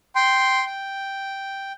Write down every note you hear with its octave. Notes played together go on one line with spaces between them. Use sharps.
G5 C6
G5